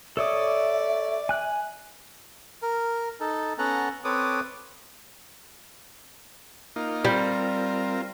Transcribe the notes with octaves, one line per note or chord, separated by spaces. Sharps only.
A4 C#5 D5 E5 D#6
G#5 F#6
A#4
D#4 A4
B3 C#4 A4 F#5 A#5
C4 A4 B4 C#5 D6 D#6
A#3 D#4 F4
G3 C4 F4 A#4